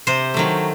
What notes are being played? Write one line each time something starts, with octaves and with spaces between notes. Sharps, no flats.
C3 C5
D#3 F#3 A3